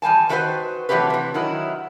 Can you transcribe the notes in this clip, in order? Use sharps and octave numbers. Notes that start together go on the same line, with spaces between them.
E2 G3 G#5 A5
D#3 A3 F#4 G4 B4 C5
C3 E3 F#3 A3 G4 B4
C3 E3
D#3 F#3 E4